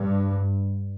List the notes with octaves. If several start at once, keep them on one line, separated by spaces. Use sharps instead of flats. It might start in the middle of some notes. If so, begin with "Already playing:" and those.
Already playing: G2